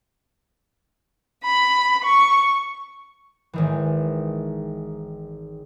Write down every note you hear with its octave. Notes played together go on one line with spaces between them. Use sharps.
B5
C#6
G#1 D#3 E3